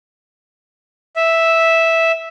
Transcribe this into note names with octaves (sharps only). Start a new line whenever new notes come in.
E5